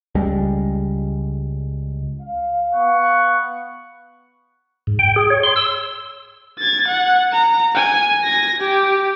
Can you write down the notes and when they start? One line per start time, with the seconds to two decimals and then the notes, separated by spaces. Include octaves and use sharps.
0.15 C#2 G3 G#3
2.22 F5
2.73 B3 F#5 C#6
4.87 G#2
4.99 G5
5.16 G#4
5.30 C#5
5.43 C6
5.56 E6
6.59 G#6 A6
6.87 F#5
7.33 A#5
7.75 G#5
8.24 G#6 A#6
8.60 G4